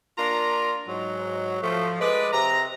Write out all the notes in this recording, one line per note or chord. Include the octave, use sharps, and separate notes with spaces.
A#3 D4 F4 A#5
G#2 F#3
F3 A3
G#3 B4 D5
C3 A#5